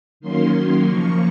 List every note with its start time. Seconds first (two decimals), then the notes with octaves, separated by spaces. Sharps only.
0.20 D#3 F#3 A#3 C#4 C6
0.87 C#3 F3 A#3 C#6